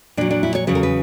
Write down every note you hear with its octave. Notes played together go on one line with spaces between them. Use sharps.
A#2 F#3 D4
D4
E4
C#5
E2 C#3 F#3 B4
A#4
B4